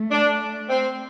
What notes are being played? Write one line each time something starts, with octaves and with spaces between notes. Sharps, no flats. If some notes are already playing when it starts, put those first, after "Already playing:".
Already playing: A3
D4
C4